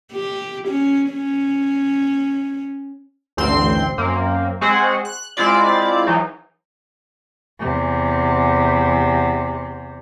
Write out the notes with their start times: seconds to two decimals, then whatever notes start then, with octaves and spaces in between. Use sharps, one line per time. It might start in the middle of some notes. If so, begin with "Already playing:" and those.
0.12 G4
0.68 C#4
1.11 C#4
3.37 A1 D2 G2 C4 C6 C7
3.98 F#2 A#3 C4
4.61 G#3 C4 F#4 G#4 C5 F#5
5.05 F#6
5.37 G#3 C4 E4 F4 D5
6.07 E3 F#3 D#4
7.59 E2 C3